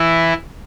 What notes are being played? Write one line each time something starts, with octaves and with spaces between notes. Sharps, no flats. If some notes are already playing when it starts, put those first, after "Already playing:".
Already playing: E3 E4